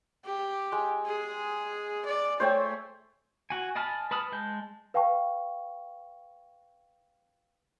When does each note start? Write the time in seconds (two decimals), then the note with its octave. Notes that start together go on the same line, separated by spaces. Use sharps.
0.25 G4
0.72 G#3
1.06 G#4
2.06 D5
2.40 A3 C5 C#5 G5
3.50 F#4 G#5
3.75 D#5 G#5 A5 B5 F6
4.11 B4 A5 B5 D#6 F6
4.32 G#3 A5 G6
4.94 B4 F5 G5 A5 C#6